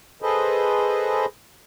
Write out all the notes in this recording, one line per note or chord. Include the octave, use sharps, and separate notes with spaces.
G#4 A4 B4 C5 D#5